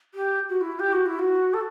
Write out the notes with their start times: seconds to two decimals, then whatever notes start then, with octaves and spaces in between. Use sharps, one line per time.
0.14 G4
0.49 F#4
0.61 E4
0.79 G4
0.93 F#4
1.06 E4
1.19 F#4
1.54 A4